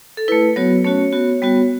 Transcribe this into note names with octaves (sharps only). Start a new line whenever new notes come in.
A4
A3 E4 B4
F#3 B3 F#4 C#5
A3 C#4 F#4 C#5
B3 F#4
G3 B3 F#4